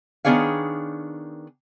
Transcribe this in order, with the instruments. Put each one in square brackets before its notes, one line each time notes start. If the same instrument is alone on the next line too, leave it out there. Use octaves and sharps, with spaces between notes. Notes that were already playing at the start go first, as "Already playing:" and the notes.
[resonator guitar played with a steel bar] D#3 B3 D4 G#4 C#5 F5